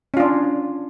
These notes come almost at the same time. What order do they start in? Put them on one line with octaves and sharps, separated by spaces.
C#4 F4 D4